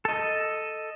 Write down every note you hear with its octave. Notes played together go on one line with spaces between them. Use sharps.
A4 D#5